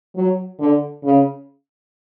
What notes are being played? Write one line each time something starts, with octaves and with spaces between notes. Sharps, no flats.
F#3
D3
C#3